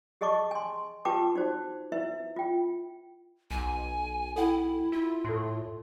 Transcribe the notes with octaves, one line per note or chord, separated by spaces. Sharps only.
G4 G#4 D#5 A5 C#6 D6
G#5 C6
F4 G4 B4 G5 A5 D6
D#4 F#4 C5
E4 B4 E5
F4 G5
B1 G#5
E4 A4 F#5 G5
E4 F4
A2 A4 C6